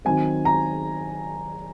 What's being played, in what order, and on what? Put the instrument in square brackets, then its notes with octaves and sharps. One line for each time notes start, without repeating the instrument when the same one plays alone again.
[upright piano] D#3 F#3 C4 G#5
A#5